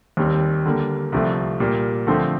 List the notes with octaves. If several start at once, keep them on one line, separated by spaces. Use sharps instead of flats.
D#2 D#3 G3 C4
D3 G3 A#3
C2 C3 F3 A3
A#2 G3 A#3
D3 F3 A3 C4